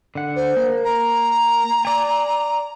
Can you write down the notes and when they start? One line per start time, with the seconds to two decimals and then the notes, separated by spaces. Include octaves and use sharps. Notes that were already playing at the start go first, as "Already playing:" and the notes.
0.15 D3 F#5
0.36 C5
0.57 A#3
0.84 A#5
1.85 D5 G#5